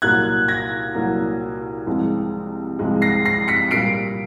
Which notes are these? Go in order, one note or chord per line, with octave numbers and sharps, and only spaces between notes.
C2 A#2 F#3 A#3 F#6 G#6
G#6 A#6
C2 A#2 F#3 A#3
C2 C3 F3 G#3
C2 C3 F3 G#3
A#6 C7
A#6 C7
B6 C#7
A#2 G3 A#3 C7 D7